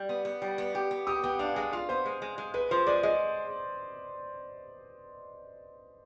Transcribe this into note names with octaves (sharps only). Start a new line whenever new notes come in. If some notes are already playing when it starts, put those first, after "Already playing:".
Already playing: G3
B3
B3
G3
B3
G4
B3
G4 D#6
B3 G5
D4 F5
G#3 F5
F4 F5
B3 C5
G#3
G#3
G#3
G#3 B4
F3 C5
G#3 D5
G#3 D#5